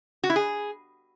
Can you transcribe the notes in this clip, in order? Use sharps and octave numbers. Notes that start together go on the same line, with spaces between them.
F#4
E4
G#4